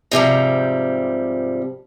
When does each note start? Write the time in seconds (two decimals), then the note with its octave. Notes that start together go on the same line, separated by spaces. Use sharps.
0.11 G#2 C3 F3 G3